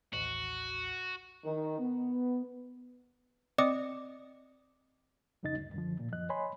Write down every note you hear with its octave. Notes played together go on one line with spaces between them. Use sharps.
A1 D#2 F#4
D#3
B3
C4 D5 D#5 D6 D#6 C#7
C2 F2 C#3 D#4 D#5 A6
D2 G2
F#2 D3 F3
A#2
F#2 F3 D#5 F#6
C#5 D#5 G#5 B5 C6